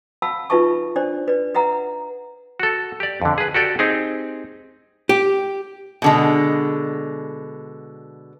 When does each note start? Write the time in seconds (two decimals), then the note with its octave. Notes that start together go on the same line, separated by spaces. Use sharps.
0.22 F5 F#5 A5 B5 E6
0.50 D#4 F4 B4 E5 A5 C#6
0.96 D4 C5 D5
1.28 B4 D5
1.55 B4 E5 F#5 A#5
2.60 F#4 A4
3.00 G4 D5
3.22 F2 D3
3.38 G#4 B4
3.54 F#4 G4 A4 D5 G5
3.79 C4 D#4 G4 G#4
5.09 G4
6.02 B2 D3 G#3